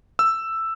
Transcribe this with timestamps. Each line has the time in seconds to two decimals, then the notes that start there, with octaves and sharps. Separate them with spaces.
0.19 E6